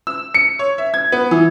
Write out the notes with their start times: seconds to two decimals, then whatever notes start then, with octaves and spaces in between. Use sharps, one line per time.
0.07 E6
0.34 C#7
0.59 C#5
0.78 E5
0.94 G#6
1.12 B3
1.31 E3